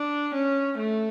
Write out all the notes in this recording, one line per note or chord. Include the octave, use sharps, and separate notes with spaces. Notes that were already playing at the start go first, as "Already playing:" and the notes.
Already playing: D4
C#4
A3